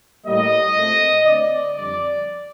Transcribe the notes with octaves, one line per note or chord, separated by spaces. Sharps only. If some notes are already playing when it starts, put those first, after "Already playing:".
A2 G3 A#3 D#5
A#2 A3 C4
D3 A3 C4 D5
F2 D3 G3 D5